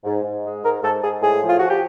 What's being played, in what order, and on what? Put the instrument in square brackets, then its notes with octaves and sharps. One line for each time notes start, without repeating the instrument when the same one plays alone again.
[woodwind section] G#2
G#2
G#3
G#2 A#4
G#2 A4
G#2 G#4
A2 G#4
F3
F4
F3 F#4
G4